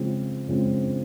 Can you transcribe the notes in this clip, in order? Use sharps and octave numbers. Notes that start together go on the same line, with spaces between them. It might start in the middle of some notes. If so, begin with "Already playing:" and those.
Already playing: C#3 F3 G#3 C4
C#3 F3 G#3 C4